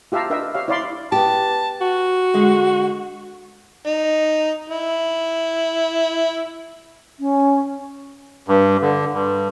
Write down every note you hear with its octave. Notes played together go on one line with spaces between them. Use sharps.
F4 G4 E5 F5 A5 A#5
D4 A#4 B4 D#5 E5 G5
G4 C#5 E5 F5
E4 C#5 D5 F5 B5 C6
B3 G4 A5
F#4
D3 G#3
D#4
E4
C#4
G2
D3
G2